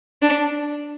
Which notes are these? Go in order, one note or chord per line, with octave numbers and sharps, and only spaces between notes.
D4